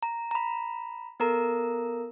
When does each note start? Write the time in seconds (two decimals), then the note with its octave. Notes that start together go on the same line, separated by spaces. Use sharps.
0.03 A#5
0.31 A#5 B5
1.20 B3 A4 A#4 A#5